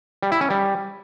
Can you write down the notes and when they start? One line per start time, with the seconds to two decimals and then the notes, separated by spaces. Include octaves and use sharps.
0.23 G3
0.32 E4
0.41 C#4
0.50 G3